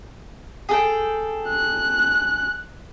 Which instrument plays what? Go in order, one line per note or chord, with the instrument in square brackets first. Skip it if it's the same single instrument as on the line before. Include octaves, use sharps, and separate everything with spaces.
[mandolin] G#4 A4 G5
[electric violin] F#6